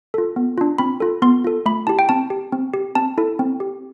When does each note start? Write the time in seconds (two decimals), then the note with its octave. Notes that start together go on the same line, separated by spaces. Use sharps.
0.14 F4 A4
0.36 B3
0.58 D4 F4
0.78 C4 B5
1.00 F4 A4
1.22 B3 C6
1.44 F4 A4
1.66 A3 B5
1.87 E4 G4 A5
1.99 G5
2.09 C4 A5
2.30 G4
2.52 C4
2.74 G4
2.95 C4 A5
3.18 E4 A4
3.39 C4
3.60 G4